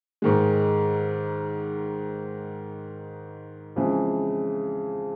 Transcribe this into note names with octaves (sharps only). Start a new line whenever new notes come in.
G#2 D#3 G#3
F2 C#3 E3 G#3